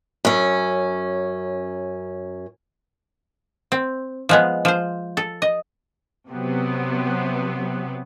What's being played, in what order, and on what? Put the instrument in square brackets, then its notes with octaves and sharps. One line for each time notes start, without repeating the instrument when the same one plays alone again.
[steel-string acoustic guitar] F#2 C#4
[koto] C4
F3 G#3 B3
F3 C5
A4
D#5
[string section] C3 F#3 B3